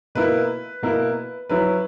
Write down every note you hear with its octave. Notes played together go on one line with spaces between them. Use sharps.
B2 A#3 E4 B4
B2 A#3 E4
F#3 C#4 E4 B4